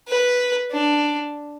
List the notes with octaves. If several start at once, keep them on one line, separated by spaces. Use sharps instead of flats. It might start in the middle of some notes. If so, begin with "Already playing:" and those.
B4
D4